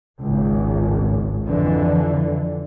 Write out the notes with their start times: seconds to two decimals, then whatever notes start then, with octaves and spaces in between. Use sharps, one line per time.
0.20 G#1 C#2
1.44 F2 D3 E3